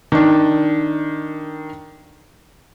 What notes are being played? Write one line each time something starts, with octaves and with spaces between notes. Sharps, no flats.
D#3 D4